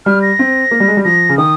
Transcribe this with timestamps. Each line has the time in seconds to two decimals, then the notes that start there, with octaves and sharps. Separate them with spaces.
0.06 G3 F6
0.22 A#6
0.39 C4
0.71 A#3
0.80 G3
0.88 G#3
0.97 G3
1.04 F3 A#6
1.29 C#3
1.38 D#3 D#6